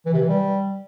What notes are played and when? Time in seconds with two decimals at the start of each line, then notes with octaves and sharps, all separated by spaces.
0.06 E3
0.14 C3
0.21 E3
0.29 G3